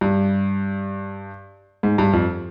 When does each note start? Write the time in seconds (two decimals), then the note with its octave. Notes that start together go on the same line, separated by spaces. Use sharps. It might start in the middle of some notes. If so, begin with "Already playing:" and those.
0.01 G2
1.83 G#2
1.98 G2
2.13 F2